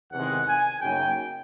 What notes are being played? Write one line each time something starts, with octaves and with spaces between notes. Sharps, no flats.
E2 C3 D#3 G#3 F#5
G#5
F#2 C#3 F#3 A#3 D#4 G5